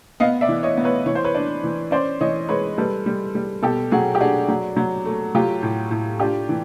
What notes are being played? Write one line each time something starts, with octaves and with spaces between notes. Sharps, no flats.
B3 D#5 F5
D5 E5
E3
C#5 D#5
B3
B4 C#5
E3 C#5
C5
B4 C#5
D4
E3
C#4 C5 D5
E3 C#5 D#5
G#3 B4 C#5
G3 A4 B4
G3
G3
B2 G4 A4
F#3 F#4 G#4
G4
D4 F#4 G#4
F#3
F#3
A3
F#3 F4 G4
A2
A2
D4 F4 G4
E3